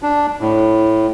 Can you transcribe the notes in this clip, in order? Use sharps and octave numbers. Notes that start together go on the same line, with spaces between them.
D4
A2